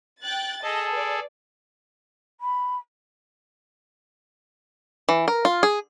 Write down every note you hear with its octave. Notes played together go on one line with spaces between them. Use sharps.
G5 F#6 A6
G#4 A4 D#5 A5
B4 D5
B5
E3
A#4
F4
G#4